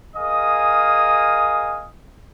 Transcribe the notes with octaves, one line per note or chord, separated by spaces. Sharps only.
G#4 A#4 D#5 F5 G#5 D#6